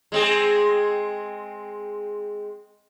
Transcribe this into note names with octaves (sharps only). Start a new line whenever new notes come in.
G#3 C4 G#4